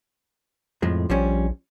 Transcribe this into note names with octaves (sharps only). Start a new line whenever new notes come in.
F2 A2 F3 G#3
A#1 F3 G3 C#4